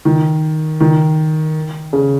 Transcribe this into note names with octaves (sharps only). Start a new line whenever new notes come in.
D#3
D#3
C#3